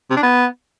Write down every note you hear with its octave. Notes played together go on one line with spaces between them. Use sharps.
C3
D4
B3